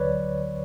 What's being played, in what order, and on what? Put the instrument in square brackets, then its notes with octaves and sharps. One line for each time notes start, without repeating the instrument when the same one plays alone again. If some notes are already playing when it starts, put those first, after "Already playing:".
Already playing: [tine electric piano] D2 D3 F#3 B4 C#5 D5